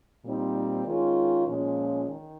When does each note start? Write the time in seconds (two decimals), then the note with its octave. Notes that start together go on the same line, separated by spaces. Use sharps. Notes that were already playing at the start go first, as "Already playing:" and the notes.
0.25 A#2 G3 C4 D#4
0.86 D#3 G#3 C#4 F4
1.47 A#2 F3 G#3 C#4
2.09 D#3